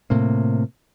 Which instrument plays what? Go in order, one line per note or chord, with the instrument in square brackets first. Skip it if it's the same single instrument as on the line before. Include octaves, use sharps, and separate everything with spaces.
[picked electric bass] A2 C3 A#3